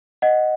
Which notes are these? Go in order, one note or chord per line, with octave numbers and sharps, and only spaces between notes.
D#5 F#5